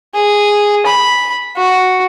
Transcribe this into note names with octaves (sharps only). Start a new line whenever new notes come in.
G#4
B5
F#4